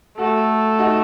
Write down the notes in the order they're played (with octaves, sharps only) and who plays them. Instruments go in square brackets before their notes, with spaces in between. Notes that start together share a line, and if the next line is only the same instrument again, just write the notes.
[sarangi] A3 [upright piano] F#4 A4
[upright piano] D#4 F#4